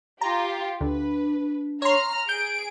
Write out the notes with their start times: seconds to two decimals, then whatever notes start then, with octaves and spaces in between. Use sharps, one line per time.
0.21 F4 G4 A#5
0.81 D2 D4 B4
1.82 C#5 A#5 C6 F6
2.29 G#4 G6 D7